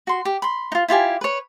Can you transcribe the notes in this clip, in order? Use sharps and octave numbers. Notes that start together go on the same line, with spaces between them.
F#4 C6
G4
B5 C6
D#4 F4
E4 F4 G4 G#5
B4 C#5